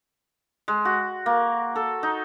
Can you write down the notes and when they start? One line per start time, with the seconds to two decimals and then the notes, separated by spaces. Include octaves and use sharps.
0.68 G#3
0.85 F#4
1.26 A#3
1.76 A4
2.03 D#4